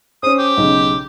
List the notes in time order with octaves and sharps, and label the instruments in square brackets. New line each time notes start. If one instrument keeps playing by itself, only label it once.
[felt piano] C#4 C5 [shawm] D#6
[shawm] G4
[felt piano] B1 C#3